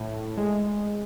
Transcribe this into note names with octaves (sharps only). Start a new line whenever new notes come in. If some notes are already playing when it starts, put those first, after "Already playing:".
Already playing: A2
G#3